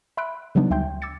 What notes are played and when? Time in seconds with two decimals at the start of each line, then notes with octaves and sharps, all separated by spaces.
0.17 E5 B5 C6 E6 F#6 D7
0.55 C#3 F#3 G3 B3 D4 D#4
0.71 D2 E5 G5 C6 G6
1.02 D6 E6 G#6 A6 C#7